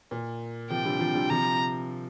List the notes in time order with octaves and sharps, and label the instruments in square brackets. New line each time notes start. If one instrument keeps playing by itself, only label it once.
[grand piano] A#2
[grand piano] C3 F3 [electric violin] G5
[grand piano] D3 G3
C3 F3
D3 G3
[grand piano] C3 F3 [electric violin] A#5